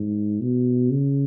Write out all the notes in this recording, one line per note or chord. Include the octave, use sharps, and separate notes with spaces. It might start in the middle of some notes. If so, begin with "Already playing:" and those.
Already playing: G#2
B2
C#3